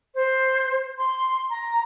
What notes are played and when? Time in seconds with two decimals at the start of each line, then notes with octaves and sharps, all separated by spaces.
0.16 C5
0.98 C6
1.50 A#5